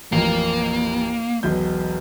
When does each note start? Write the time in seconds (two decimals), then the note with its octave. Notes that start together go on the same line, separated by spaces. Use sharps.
0.12 A1 F2 A#3
1.43 E1 B1 G6